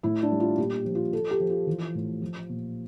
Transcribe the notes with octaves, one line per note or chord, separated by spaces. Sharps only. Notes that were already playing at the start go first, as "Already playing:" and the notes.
A2 E4
D4
G3
F4
A#2 G4
F3
F4
F3 A4
G4
F3
F4
E3
A2
F3
A#2